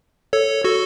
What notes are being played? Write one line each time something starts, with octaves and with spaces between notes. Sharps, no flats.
A4 C#5
F#4 A4